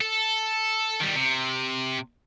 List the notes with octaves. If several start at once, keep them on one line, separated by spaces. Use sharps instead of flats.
A4
D#3 G3
C3